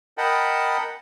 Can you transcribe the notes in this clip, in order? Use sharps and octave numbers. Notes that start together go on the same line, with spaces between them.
A#4 D#5 F#5 G5 A5 B5